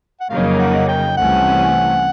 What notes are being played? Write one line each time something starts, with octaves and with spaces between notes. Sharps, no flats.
F#5
F2 C#3 F#3 A#3 D#4 F5
F#5
G5
C2 C3 E3 A3 C#4 F#5